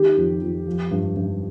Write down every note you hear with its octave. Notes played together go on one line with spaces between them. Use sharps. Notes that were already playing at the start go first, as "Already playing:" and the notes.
Already playing: D#3 G4
F2
F2
F3
G2
G2